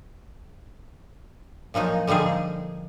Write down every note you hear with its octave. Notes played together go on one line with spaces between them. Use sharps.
A#2 F3 F#3 D#4
D3 F3 G3 D#4 G#4